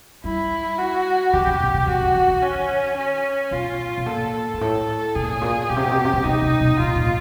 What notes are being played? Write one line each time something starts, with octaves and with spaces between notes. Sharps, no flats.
G3 E4
F#4
D3 G4
C#3
B2
C3
C#3 F#4
C#3
D#3
D#3
C#4
C#4
B2 F4
B2
A#2 A4
G#2
A2 A4
B2 G#4
A#2
A2
A#2
B2 G4
C3
B2
C3
B2
C3
B2
C3 D#4
C3
B2
A#2 F4
A#2